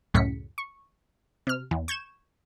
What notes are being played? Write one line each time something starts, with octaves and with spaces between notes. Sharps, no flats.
C#2 F#2 A2 C#3 B6 C#7
C#6
C3 F6
E2
C#6 G6 G#6 E7